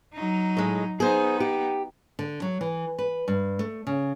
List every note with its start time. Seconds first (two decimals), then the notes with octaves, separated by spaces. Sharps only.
0.14 F#3 D#4
0.57 A2 G#3
1.00 B3 D#4 G#4 C5
1.40 G4
2.19 D3
2.42 F#3
2.61 E3
2.99 B4
3.28 G2
3.59 A3
3.87 C#3